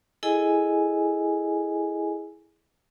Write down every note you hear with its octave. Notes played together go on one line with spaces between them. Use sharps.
E4 G#4 A4 D#5 G#5